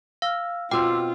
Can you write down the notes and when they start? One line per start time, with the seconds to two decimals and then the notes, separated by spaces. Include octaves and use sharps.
0.22 F5 E6 F6
0.71 B2 C4 F4 G5 D6 E6